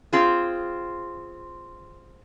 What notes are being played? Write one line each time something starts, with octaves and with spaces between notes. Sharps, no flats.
C4 F4 G#4